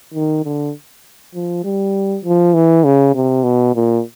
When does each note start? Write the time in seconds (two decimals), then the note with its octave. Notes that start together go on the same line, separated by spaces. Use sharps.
0.14 D#3
0.45 D3
1.35 F3
1.64 G3
2.24 F3
2.54 E3
2.84 C#3
3.15 C3
3.44 B2
3.75 A#2